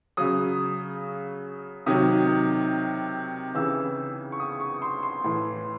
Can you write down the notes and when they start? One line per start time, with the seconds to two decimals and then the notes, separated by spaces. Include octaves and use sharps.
0.17 C#3 F#3 D#6
1.86 C3 D#3 F#3 D#6
3.55 C#3 E3 E6
4.32 C#6
4.40 D#6
4.60 C#6
4.82 C6
5.03 C6
5.24 A2 E3